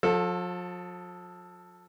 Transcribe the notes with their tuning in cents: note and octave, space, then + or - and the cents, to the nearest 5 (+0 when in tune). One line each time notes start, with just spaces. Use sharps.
F3 +40 A4 +0